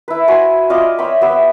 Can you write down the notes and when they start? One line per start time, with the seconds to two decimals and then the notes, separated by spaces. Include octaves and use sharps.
0.08 E4 B4
0.28 F#4 C5 G#5 B5
0.70 F4 D5 D#5 F5
0.99 C#5 E5 G5 B5
1.21 B3 G4 E5